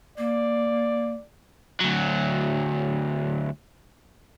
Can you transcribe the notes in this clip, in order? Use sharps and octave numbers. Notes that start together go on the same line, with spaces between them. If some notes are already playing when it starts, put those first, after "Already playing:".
A#3 D5
D2 F#3